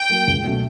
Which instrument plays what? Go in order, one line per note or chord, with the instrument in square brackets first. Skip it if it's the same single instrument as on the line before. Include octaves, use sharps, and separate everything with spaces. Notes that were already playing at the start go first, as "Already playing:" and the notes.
Already playing: [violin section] G5
[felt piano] F#3 A#3
C#2
B2 F#3 A3 C#4